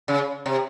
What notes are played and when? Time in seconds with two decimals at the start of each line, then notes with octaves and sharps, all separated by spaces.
0.08 C#3
0.46 C3